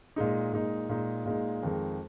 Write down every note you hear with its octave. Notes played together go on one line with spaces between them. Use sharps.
A#2 G#3 D#4
A#2 G#3 D#4
A#2 G#3 D#4
A#2 G#3 D#4
F2 D#3 G#3